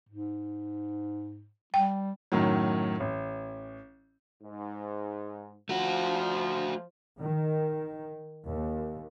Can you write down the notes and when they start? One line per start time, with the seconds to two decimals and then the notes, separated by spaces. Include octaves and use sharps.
0.09 G#2
1.74 G3 G5
2.32 F#2 A2 D#3 F#3
3.00 A1
4.42 G#2
5.69 F3 A3 F#4
7.19 D#3
8.46 D#2